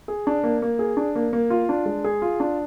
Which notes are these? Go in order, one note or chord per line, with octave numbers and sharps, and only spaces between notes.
G#4
D4
A#3
A#3
G#4
D4
A#3
A#3
F4
D4
G#3
G#4
F4
D4